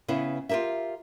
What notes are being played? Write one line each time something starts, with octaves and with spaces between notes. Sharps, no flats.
C#3 B3 E4
F4 G4 G#4 A#4 E5